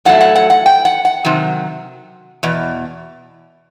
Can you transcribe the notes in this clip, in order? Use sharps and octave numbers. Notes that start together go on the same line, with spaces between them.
A2 F#3 A3 F#5
F#5
F#5
F#5
G5
F#5
F#5
C3 D#3 F#3
E2 B2